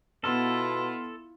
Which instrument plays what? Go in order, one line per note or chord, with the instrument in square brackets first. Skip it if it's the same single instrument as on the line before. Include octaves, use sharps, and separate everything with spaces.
[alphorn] B2 [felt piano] B3 C6 F6 [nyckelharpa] E4 F4 [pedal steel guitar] A4